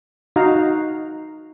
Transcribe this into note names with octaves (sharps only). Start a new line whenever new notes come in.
D#4 F#4 F5 A#5